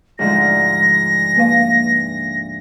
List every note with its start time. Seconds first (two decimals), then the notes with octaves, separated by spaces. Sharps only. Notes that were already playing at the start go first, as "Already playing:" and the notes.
0.19 D2 G#2 F3 A#6
1.36 A#3 B4 F5